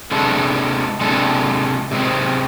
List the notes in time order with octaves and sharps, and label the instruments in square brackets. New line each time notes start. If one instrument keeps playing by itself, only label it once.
[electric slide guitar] C3 G#3 D4 A4
C3 G#3 D4 A4
C3 G#3 C4